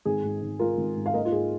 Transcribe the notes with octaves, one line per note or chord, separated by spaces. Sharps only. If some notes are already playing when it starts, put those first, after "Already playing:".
G#1 G#4
G#2
G#1
G#3 F4 A#4
G#1
G#2
F5
A#3 A#4 D#5
F4
G#2 G#4